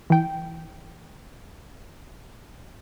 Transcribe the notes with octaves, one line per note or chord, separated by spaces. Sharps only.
E3 G5